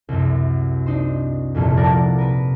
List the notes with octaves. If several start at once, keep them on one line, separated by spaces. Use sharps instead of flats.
C2 F#2
D4 D#4 C5
G1 C2 F2 A#2
A#4 D5 F5 F#5 A5
A#4 B4